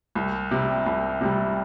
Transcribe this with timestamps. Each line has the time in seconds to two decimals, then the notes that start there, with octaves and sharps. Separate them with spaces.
0.15 C2
0.51 C3 G3
0.86 C2
1.21 C3 G3